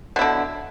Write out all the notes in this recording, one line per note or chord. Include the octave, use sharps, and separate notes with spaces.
B2 D3 E4